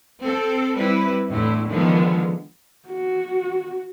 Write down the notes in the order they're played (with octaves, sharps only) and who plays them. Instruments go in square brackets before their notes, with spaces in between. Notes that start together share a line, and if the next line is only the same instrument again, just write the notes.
[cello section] C4 A4
G3 C4 E4 B4
E2 A2 D3 E4
D3 D#3 F3 G#3 B3
[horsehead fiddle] F#4